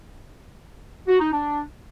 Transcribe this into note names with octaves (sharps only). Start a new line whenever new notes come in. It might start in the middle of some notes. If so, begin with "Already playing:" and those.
F#4
D#4
D4